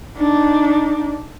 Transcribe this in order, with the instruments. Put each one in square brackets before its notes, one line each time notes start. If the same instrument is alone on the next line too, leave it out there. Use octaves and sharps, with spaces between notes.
[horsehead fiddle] D4 D#4